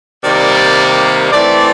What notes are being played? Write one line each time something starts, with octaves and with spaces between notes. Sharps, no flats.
C3 D#3 G3 A#3 D5
E3 A3 C4 D5